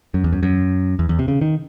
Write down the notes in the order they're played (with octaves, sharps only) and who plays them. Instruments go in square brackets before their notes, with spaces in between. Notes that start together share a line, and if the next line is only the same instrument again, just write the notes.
[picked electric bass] F#2
E2
F#2
F#2
E2
E2
C3
C#3
D#3